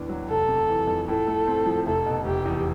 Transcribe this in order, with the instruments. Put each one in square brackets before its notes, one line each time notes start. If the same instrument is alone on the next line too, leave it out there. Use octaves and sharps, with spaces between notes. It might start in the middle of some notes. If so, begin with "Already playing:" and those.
Already playing: [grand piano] D#2 A2 B3 D4
F#3
[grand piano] F1 [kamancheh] A4
[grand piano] C3
E3
F2
[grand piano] A2 [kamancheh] A4
[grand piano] A3
C4
F3
[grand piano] F1 [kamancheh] A4
[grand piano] B2
[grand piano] F1 [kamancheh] G4
[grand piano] E2